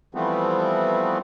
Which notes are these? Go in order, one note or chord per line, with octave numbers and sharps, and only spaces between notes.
E3 F3 G3 A3 B3 C4